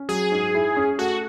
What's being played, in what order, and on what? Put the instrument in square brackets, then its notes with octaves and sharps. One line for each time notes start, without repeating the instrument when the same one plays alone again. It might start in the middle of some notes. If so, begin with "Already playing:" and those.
Already playing: [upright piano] C#4
[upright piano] F#3 [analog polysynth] G#4
[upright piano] G#2
E4
C#4
[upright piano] A3 [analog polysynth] F#4